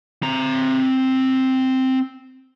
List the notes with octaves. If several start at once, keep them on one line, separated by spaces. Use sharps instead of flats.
C4 A#5